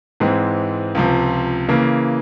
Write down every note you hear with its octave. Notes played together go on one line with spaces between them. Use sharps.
G#2 E3 G#3 C4
C#2 C3 F3
C#3 E3 A#3